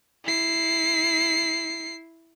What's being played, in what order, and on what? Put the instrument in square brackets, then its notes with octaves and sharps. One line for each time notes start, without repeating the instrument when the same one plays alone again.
[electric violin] E4 C7